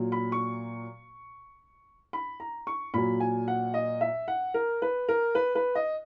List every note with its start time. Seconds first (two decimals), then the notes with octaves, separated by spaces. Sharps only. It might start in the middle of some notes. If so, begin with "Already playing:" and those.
Already playing: A#2 F#3
0.12 B5
0.32 C#6
2.13 B5
2.40 A#5
2.67 C#6
2.94 A#2 F#3 B5
3.20 G#5
3.48 F#5
3.74 D#5
4.01 E5
4.28 F#5
4.54 A#4
4.82 B4
5.09 A#4
5.35 B4
5.55 B4
5.75 D#5